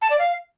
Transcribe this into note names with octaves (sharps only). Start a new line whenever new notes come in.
A5
D5
F5